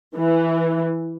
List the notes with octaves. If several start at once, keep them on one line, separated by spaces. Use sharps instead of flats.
E3